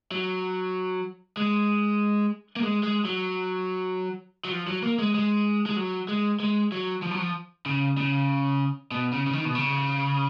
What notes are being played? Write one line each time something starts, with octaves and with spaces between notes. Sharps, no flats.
F#3
G#3
A#3
G#3
G#3
F#3
F#3
F3
F#3
A#3
G#3
G#3
G#3
F#3
G#3
G#3
F#3
F3
F#3
F3
C#3
C#3
B2
C#3
C#3
D#3
B2
C#3